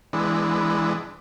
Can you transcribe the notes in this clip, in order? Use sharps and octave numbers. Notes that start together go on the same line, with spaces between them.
E3 G#3 B3 D4